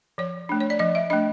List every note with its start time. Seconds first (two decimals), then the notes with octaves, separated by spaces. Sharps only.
0.18 F3 C#5
0.49 A3 D4
0.60 C#5
0.70 D5
0.79 F3 D#5
0.95 E5
1.10 A3 D4 D#5